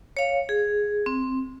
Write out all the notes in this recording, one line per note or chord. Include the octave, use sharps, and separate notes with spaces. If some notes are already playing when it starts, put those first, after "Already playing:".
C#5 F5
G#4
C4